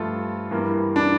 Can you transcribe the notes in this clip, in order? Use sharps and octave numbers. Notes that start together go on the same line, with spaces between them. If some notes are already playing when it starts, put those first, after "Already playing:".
Already playing: G2 F3 A3 F4 A4
G2 E3 A#3
D4